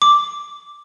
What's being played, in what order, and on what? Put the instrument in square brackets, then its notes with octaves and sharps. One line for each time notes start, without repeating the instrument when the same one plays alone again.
[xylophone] D6